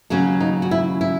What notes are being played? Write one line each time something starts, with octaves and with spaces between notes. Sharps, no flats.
D#2 C#3 F#3 C#4 F#4
D#4
F#4
E4
E4